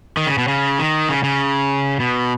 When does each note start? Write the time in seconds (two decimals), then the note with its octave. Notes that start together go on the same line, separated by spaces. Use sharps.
0.17 D#3
0.27 C#3
0.38 B2
0.48 C#3
0.79 D#3
1.09 C#3
1.24 C#3
2.00 B2